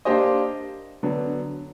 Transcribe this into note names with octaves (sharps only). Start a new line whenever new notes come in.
A#3 D4 G4 C5 D#5
D3 F#3 B3